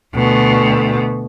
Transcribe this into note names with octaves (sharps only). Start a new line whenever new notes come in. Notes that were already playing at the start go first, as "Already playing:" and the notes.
D2 B2